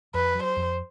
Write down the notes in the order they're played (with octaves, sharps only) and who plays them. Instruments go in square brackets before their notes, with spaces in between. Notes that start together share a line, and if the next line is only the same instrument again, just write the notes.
[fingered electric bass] F2 [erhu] B4
[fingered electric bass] F#3
[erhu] C5
[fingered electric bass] F2